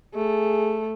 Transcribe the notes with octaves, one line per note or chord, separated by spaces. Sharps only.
A3 G#4